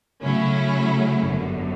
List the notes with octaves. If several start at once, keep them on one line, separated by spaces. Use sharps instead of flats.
C#3 F#3 A3 C#4 E4
G1 F#2 D3